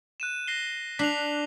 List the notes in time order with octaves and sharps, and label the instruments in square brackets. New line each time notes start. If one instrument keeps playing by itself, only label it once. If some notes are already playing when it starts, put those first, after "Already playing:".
[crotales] F#6 D#7 E7
A#6 C7 G7
[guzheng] D4 [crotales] B6 C7 F7